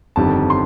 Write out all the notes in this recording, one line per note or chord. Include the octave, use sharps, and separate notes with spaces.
G1 F2 D#3 G3 A5
C6